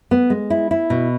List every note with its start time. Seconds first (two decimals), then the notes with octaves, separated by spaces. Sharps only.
0.11 B3
0.30 G#3
0.50 E4
0.71 E4
0.90 B2